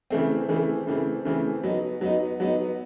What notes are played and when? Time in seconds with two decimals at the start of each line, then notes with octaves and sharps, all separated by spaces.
0.10 C#3 E3 A3 C4
0.48 C#3 E3 A3 C4
0.87 C#3 E3 A3 C4
1.25 C#3 E3 A3 C4
1.64 F#3 B3 D#4
2.01 F#3 B3 D#4
2.40 F#3 B3 D#4